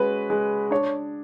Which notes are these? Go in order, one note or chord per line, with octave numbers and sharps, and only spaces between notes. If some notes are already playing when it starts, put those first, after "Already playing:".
Already playing: G#3 C#4 F#4 B4
G#3
D4 C#5